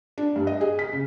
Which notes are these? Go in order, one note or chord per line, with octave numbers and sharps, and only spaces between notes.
D4
G2
D#5
G#4
B6
C#3